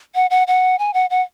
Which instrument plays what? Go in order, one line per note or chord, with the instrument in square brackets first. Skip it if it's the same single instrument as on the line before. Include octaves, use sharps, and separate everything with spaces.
[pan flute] F#5
F#5
F#5
G#5
F#5
F#5